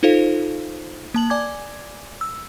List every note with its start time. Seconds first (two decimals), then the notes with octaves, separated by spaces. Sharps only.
0.03 D#4 F4 A4 C5 F5
1.14 A#3 A5 F#7
1.30 D5 G#5 D6 G#6
2.21 E6